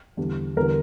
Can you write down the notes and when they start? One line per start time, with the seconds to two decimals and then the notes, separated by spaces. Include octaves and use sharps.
0.17 E2 D3 G3
0.57 E2 D3 G3 A#4